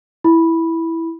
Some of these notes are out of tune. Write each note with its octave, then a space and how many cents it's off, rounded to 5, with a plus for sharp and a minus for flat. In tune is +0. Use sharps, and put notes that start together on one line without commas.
E4 +0 B5 -10